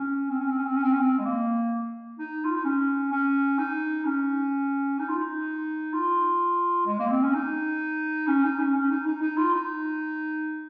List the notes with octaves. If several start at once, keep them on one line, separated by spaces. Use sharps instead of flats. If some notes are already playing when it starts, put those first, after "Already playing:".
Already playing: C#4
C4
C#4
C4
C#4
C4
C#4
C4
C#4
C4
G#3
A#3
D#4
F4
D#4
C#4
C#4
D#4
C#4
D#4
F4
D#4
F4
G#3
A#3
C4
C#4
D#4
C#4
D#4
C#4
C#4
D#4
D#4
D#4
F4
D#4